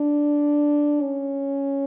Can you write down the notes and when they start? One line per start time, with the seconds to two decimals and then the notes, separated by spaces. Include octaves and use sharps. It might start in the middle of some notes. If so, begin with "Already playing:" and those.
Already playing: D4
1.02 C#4